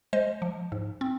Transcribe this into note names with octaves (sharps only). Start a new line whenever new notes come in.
G#3 C5 D#5
F3
G#2
C4